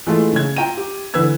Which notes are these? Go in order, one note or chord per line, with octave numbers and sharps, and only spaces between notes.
E3 G#3 A3 F4
C#3 G#6
F4 G5 A#5 D#7
G4
D3 E3 B4 E6 G#6